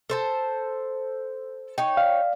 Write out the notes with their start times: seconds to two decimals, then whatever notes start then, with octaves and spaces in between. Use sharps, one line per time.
0.10 A4 C5 A5
1.78 D#4 C#5 G5
1.97 D5 F5